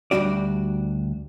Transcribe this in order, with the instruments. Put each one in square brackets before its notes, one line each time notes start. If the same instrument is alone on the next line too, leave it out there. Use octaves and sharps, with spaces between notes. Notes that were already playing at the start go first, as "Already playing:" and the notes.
[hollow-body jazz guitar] D2 A#2 G3 D4 F#4 D5